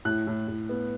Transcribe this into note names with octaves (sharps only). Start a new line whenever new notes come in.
A2 F#6
A2
A2
B3